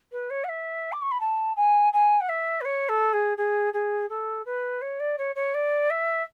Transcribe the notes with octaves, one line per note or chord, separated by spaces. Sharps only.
B4
C#5
F#5
E5
D6
C#6
B5
A5
G#5
G#5
F#5
E5
B4
C#5
A4
G#4
G#4
G#4
A4
B4
C#5
D5
C#5
C#5
D5
E5